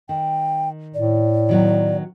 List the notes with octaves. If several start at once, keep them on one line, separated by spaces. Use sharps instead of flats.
D#3 G5
A2 D5
D#3 F#3 B3